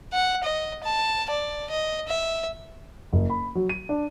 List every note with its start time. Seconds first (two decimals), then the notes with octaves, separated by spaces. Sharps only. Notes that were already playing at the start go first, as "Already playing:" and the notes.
0.13 F#5
0.44 D#5
0.84 A5
1.30 D5
1.70 D#5
2.08 E5
3.13 F#1
3.30 B5
3.55 F#3
3.69 D#7
3.89 D4